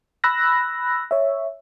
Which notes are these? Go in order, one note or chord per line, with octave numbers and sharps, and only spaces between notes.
B5 E6 F#6 A#6
C#5 E5